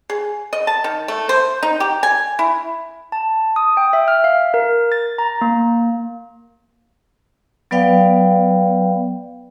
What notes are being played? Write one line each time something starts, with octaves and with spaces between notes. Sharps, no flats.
G#4
D#5
A5
D#3
A3
C5
D#4
G4
G#5
E4
A5
D#6
G5
E5
F6
F5
A#4
A6
A#5
A#3
F#3 B3 B4 D5 F5 G5